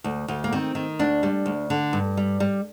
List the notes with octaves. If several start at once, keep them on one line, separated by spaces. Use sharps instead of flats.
D2
D2
A#3
D#3 C4
D#3
D2 D4
G3
D2
D3
G2
G3
G3